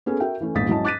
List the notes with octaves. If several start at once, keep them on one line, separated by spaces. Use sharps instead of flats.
B3 C#4 G#4 A4
F#4 A#4 E5 G5
E3 A3 C#4
A#1 E2 G#2 D#6 A6 B6
G#2 F#3 C#4 E4 D#5 A5
D6 F#6 A6 B6 D#7